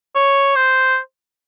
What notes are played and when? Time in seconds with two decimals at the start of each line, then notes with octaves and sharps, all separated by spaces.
0.15 C#5
0.56 C5